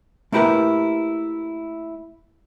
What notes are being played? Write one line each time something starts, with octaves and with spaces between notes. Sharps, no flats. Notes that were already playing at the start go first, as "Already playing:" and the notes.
A3 A#3 E4 G4 A#4 B4